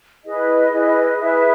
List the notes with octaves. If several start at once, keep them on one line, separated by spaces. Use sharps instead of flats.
E4 G#4 B4 D#5
E4 G#4 B4
E4 G#4 B4 E5